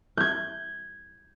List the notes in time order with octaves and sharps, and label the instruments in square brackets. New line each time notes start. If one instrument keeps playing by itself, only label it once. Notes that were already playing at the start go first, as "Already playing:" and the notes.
[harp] G6 G#6